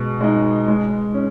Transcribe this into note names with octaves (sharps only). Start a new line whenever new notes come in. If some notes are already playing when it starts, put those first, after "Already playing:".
Already playing: B2 G#3
G#3 D#4
G#3
C#4